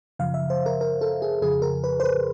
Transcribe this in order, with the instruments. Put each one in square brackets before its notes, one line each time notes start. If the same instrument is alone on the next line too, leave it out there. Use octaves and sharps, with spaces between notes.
[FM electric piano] F#2 C#3 F3 F5
E5
C5
A#4
A#4
A4
G#4
F2 C#3 F3 G#4
A#4
B4
C5
B4